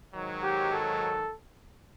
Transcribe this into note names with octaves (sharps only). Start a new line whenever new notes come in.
G#2 D#3 F#3
G4
A4